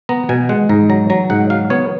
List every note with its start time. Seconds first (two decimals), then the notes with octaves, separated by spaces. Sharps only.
0.09 B3 A#5
0.29 B2 G#5
0.49 G#3 F#5
0.69 G#2 A#5
0.90 F#3 A#5
1.10 F#3 A#5
1.30 G#2 F#5
1.50 F#3 F5
1.70 B3 C#5